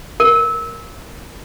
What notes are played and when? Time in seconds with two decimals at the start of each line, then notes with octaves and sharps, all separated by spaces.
0.20 A#4